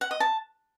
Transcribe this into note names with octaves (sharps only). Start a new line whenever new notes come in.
F#5
D#5
A5